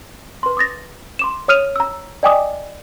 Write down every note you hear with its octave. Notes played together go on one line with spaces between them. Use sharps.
B4 C6
D6 D#6 A6 A#6
C6 D6 E7
C#5 D#6 F6 D#7 F7
A#5 E6
D5 D#5 G5 G#5 D6 D#6